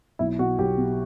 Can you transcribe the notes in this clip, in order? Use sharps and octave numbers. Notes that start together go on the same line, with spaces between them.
B1 E4
B2 F#4
B1 G4
B2